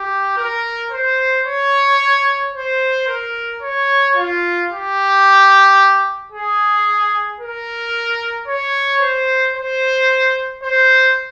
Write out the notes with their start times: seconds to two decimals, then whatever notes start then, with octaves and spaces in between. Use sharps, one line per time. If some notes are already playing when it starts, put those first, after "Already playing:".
Already playing: G4
0.37 A#4
0.91 C5
1.46 C#5
2.54 C5
3.08 A#4
3.62 C#5
4.16 F4
4.70 G4
6.32 G#4
7.40 A#4
8.47 C#5
9.01 C5
9.56 C5
10.63 C5